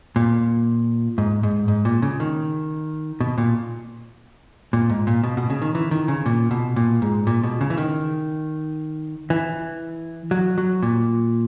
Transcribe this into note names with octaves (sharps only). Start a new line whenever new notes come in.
A#2
G#2
G#2
G#2
A#2
C#3
D#3
B2
A#2
A#2
G#2
A#2
B2
B2
C#3
D#3
E3
D#3
C#3
A#2
B2
A#2
G#2
A#2
B2
C#3
E3
D#3
E3
F#3
F#3
A#2